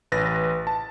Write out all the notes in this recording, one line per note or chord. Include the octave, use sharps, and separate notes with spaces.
A1 B4 A6 A#6
A5